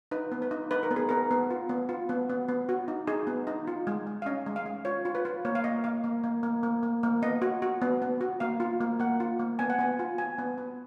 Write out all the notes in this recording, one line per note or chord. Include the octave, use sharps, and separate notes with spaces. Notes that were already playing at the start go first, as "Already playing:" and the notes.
D#4 B4
B3
B4
D#4
D#4 B4
A#4
B3
G#4
B3 A#4
B3
F4
B3
F4
B3
B3
B3
F#4
D#4
D#4 G#4
B3
D#4
F4
G#3
G#3
F5
C#4 D#5
G#3
F5
G#3
F4 C#5
F4
B4
F4
A#3 C#5
F5
A#3 D#5
A#3 F5
A#3
A#3
A#3
A#3
A#3
A#3
B3 D#5
F#4
F#4
B3
B3
F#4
A#3 F5
F4
A#3
A#3 F#5
F4
A#3
B3 G#5
F#5
B3 G#5
F4
B3 G#5
B3
B3